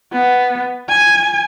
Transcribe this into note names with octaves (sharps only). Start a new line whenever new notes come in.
B3
G#5